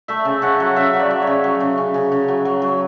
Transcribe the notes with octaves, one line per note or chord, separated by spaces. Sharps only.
A3 E5
C#3
C#3 F#5
F#3
C#3 E5
F#3
D5
F#3
C#5
C#3
F#3
C#3
C#3
C#3
C#3
F#3
F#3
F#3